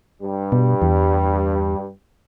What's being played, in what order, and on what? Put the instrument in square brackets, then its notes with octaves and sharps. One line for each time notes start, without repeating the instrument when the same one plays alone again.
[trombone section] G2 G3
[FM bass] B2
E2